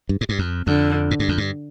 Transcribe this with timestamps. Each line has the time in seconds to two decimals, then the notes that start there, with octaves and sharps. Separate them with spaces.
0.09 G2
0.21 G#2
0.29 G2
0.39 F2
0.67 F2 D3
1.11 G#2
1.19 G2
1.29 F2
1.38 G2